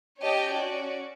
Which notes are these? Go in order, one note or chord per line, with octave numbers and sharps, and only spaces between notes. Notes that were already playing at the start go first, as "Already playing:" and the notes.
C#4 G4 C#5 D#5 G5 A5
C#4 F#4 D5